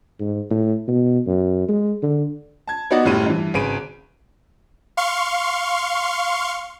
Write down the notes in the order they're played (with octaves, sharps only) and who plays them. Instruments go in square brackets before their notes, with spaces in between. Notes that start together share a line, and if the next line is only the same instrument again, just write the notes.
[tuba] G#2
A2
B2
F#2
G#3
D3
[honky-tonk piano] A5 G#6
B3 D#4 F#4 D5 D#5 F#5
F#1 A2 G3 D#7
G2 E3
G#1 C#3 G#4 B4 D7 D#7
[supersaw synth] F5 C6 C#6